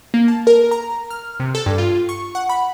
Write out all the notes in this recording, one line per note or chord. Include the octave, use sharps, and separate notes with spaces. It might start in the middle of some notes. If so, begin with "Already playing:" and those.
A#3
A5
A#4
A#5
F6
C3
A4
G2
F4
C#6
F#5
B5